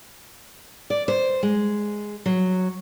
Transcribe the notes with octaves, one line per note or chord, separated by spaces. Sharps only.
D5
C5
G#3
F#3